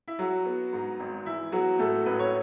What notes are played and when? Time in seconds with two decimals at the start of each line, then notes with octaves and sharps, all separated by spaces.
0.08 E4
0.19 F#3 F#4
0.46 B3
0.73 G#2
1.00 G#1
1.26 E3 E4
1.52 F#3 B3 F#4
1.79 A2 A3 A4
2.06 A1 B4
2.19 C#5